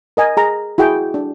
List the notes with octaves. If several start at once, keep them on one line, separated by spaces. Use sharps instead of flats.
A#4 D#5 G#5
G#4 A#5
E4 F#4 G#4 G5
D4